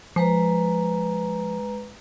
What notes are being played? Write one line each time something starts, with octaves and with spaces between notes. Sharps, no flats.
F3 G#3 B4 A#5